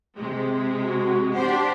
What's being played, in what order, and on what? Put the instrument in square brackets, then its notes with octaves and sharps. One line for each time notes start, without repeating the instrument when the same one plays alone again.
[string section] C3 G#3
[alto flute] F#4
[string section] D4 G4 C5 [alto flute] F#5